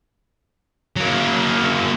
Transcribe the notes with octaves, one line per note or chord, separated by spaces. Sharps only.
F#3 A#3